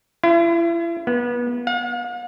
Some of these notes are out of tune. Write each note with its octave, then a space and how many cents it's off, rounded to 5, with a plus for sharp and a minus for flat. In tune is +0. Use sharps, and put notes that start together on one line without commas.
E4 +40
B3 -30
F5 +45